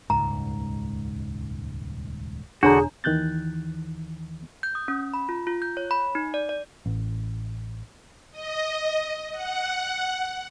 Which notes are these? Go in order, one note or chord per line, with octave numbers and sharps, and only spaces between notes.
D#1 C#2 G#2 A#5
E1 D3 D4 F#4 G#4 C#5 A#5
D#2 D#3 E3 F#6 G6 A6
G6
D#6
C#4
B5
F4
F4
G6
C#5
B5
D#4
D5
D5
A1
D#5
F#5